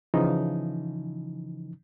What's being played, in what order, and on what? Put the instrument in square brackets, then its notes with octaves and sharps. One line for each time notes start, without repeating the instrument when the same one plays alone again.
[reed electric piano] C#3 E3 F3 D#4